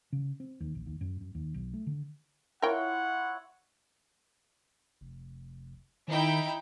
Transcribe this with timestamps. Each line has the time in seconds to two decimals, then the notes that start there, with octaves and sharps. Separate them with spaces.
0.12 C#3
0.40 C4
0.60 D#2
0.75 A#1
0.86 D#2
1.01 F#2
1.21 F#2
1.35 D#2
1.54 B1
1.74 A3
1.87 D3
2.62 E4 F4 A#4 C#5 F#5 G5
5.01 F1
6.08 D#3 D#4 E4 G5